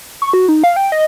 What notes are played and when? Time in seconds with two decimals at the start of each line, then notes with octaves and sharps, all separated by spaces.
0.22 C#6
0.33 F#4
0.48 D#4
0.64 F5
0.76 G5
0.92 D#5